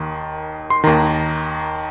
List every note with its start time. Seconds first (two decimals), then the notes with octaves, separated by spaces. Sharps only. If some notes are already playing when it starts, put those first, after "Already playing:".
Already playing: D#2 D#3
0.70 C6
0.84 D#2 D#3 A#5